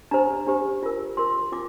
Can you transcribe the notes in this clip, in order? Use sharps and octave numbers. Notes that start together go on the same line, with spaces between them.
D4 G4 C5 A#5
D4 G4 C5
F4 A#4
F4 A#4 C6
F4 D6